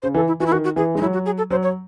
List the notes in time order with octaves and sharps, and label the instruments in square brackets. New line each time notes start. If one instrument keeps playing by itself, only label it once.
[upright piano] C#3 [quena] C5
[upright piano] E3 [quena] A4
[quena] E4
[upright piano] E3 [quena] F#4
[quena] E4
[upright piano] D#3 [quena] F#4
[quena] F#4
[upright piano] E3 [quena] G#4
[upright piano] G#3 [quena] D#4
[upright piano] F#3 [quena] E4
[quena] F#4
G#4
A4
[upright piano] F#3 [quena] C5
[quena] C#5